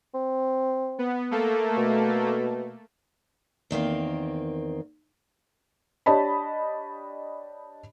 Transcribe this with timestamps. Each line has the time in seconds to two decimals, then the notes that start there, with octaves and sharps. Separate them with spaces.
0.14 C4
0.99 B3
1.31 A3 A#3 A4
1.77 B2
3.71 E2 D#3 A#3 C4
6.06 D4 G4 C#5 D#5 A5 B5